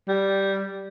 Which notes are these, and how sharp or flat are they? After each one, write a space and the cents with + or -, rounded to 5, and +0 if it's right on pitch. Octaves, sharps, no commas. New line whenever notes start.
G3 -5